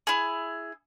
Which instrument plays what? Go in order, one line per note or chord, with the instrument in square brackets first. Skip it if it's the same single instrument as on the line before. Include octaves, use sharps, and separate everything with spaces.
[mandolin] E4 G#4